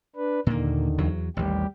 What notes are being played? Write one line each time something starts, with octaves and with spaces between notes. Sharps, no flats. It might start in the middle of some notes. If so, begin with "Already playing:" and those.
D4 B4
D#2 A#2 D3 D#3 A#3
E2 F#3
A1 D#2 G3 G4